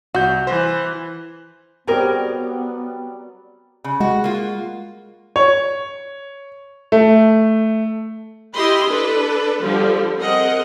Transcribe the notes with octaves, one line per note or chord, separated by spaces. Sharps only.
C2 F#4 G6
E3 C5
F#3 G3 B3 C4 G4 G#4 A#4 D5
C#3
G#3 F#4
A#3 F4
C#5
A3
E4 G4 D#5 B5 C6
D4 A4 B4
D3 F3 G3
C4 G#4 A#4 D#5 F#5